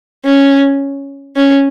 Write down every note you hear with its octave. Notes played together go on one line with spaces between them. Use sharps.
C#4
C#4